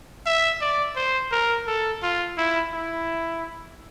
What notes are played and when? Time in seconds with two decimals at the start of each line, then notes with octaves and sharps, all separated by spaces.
0.26 E5
0.61 D5
0.96 C5
1.31 A#4
1.67 A4
2.03 F4
2.37 E4
2.73 E4